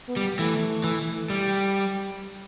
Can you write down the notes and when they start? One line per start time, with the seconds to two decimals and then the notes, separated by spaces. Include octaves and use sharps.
0.09 B3
0.17 G3
0.39 E3 A3
0.84 E3
1.30 G3